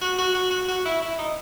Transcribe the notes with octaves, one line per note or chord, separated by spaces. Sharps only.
F#4
F#4
F#4
F#4
F#4
E4
E4
D#4